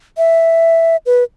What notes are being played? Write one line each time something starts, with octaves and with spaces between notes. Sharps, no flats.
E5
B4